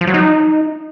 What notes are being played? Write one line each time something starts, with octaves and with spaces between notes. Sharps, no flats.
F3
F#3
D#4